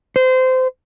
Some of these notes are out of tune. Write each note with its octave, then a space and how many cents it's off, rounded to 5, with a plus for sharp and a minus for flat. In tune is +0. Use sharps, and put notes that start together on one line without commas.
C5 -25